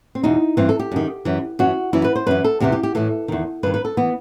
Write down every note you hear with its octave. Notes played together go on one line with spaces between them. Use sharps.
C4
E2 B2 D#4
G2 E3 C4
A4
G4
F#2 D#3
F#2 E3
F#2 E3 F#4
F#2 E3 E4
B4
C5
F#2 E3 B4
A4
E2 C3 E3 G4
G4
G4
A2 E3 A4
E2 D#3
G2 D#3 B4
B4
A4
E3 B3